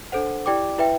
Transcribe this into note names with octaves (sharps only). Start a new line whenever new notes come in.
D4 A4 C5 F#5
E4 G4 D5 G5 D6
E4 B4 E5 G5